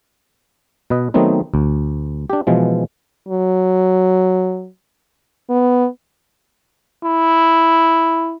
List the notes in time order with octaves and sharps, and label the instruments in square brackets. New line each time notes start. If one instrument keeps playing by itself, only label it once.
[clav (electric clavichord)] B2 B4 D#5
D#3 F#3 A3 B3 C4 D#4
D2
D4 G4
B2 E3 F3 G#3
[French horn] F#3
B3
[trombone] E4